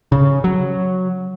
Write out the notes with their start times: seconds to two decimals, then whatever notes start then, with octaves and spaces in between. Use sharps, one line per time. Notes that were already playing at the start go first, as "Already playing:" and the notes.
0.12 C#3
0.44 F#3